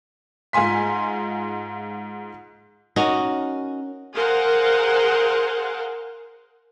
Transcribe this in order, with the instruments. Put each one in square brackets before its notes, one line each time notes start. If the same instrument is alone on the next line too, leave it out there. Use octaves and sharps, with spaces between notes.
[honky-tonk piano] G#2 F4 G#5 C6 B6
[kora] C#4 D#4 F#4 A#4
[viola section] G#4 A#4 C5 F5 F#5